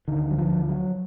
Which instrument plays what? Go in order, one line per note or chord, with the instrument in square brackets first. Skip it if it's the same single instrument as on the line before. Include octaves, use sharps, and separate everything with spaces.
[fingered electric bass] D2 D3 D#3
F#3
F3
F#3